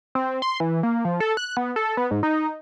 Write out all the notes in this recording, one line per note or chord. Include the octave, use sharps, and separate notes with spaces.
C4
C6
E3
A#3
F3
A4
F#6
B3
A4
B3
G#2
D#4